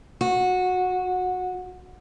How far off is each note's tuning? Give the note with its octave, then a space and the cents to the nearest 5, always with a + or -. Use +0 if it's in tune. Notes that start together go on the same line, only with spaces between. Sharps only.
F#4 -15